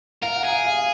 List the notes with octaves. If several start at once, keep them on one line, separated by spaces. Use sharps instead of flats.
A#4 F5
F#5
G#4
F5
F5